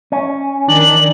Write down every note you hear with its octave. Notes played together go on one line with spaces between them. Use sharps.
C#4
D#3 D4 F#7